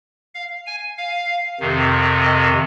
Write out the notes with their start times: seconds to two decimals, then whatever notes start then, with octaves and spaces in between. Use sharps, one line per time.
0.35 F5
0.66 G#5
0.98 F5
1.60 F2 C3 D#3
2.23 D#5